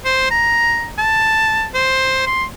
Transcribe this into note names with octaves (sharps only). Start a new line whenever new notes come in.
C5
A#5
A5
C5
C6